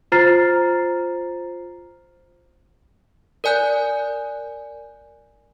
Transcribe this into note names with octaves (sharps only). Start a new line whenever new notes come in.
F4 C5 A#5 F6 A6 C7
A#4 D5 G#5 F#6 G6